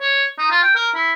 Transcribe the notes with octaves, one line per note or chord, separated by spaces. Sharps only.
C#5
D#4
F4
G5
A#4
E4